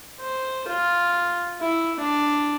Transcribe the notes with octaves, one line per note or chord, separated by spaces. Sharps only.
C5
F4
E4
D4